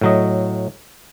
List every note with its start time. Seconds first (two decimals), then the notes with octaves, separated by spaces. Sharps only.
0.01 A2 F#3 D#5